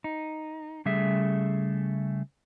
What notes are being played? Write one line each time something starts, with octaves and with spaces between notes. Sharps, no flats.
D#4
C#3 G3 A3 G#4 E5